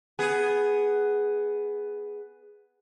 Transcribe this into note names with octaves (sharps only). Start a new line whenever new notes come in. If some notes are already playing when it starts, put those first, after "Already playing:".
B3 G#4